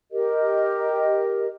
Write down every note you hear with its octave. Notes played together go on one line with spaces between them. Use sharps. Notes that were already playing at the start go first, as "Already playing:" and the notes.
G4 A#4 D#5